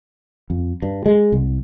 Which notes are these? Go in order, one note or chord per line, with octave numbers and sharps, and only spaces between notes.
F2
G2
G#3
C2